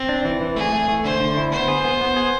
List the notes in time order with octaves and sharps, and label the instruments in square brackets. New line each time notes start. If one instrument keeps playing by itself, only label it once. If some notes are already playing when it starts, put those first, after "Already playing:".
Already playing: [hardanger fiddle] C4
[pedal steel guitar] D4
E3
E3
[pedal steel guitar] A3 [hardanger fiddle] G#4
[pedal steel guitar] A3
A3
[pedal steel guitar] D3 [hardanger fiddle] C5
[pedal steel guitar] D3
E4
[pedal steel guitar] B3 [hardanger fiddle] C5
[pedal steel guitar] G#4
B3
B3
G#4